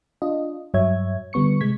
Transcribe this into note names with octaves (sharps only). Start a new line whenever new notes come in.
D4 F4 D#5
G2 F#3 C#5 E5 G#6
D3 G3 B3 C#6 C#7
C3 G#3 G#6 B6